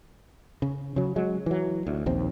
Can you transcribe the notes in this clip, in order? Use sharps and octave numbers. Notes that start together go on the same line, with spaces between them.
C#3
C#3 F#3
F#3 G#3
E3 F#3
D2
A#1 D#2 C4